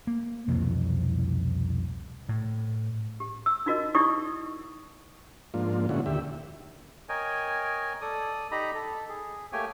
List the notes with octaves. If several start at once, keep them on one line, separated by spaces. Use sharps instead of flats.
A#3
C2 F2 B2 E3
A2
G4
E6
D#4 F4 F#4 A#4 D#5
D#4 E4 G4 D5 C#6 D#6
G#2 F3 A#3 D4 F4
A#2 D3 G#3 C#4 E4 F#4
D#2 D3 G4 E5
A#4 C#5 D#5 G5 G#5
A4 D5 D#6
D#4 G4 D#5 A#5 B5
A4
G#4
A3 A#3 G4 C#5 G5 G#5